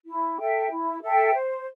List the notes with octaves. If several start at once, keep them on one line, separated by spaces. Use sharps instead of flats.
E4
A4 E5 G5
E4
A4 E5 G5
C5